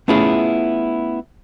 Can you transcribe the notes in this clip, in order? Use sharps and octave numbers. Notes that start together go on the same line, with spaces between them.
A3 B3 C#4 E4 F4 G#4